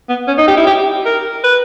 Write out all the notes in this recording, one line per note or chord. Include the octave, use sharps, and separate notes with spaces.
B3
C#4
D#4
G4
E4
G4
A#4
B4